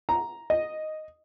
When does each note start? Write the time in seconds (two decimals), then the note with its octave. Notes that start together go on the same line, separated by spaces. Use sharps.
0.09 A#5
0.50 D#5